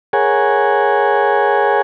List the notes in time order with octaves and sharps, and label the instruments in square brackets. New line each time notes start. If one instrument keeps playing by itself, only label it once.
[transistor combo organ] G#4 A#4 C#5 F#5 G#5